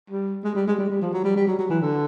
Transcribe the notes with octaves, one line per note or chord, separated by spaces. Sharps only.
G3
G#3
G3
G#3
G3
G3
F3
F#3
G3
G3
F#3
F#3
E3
D3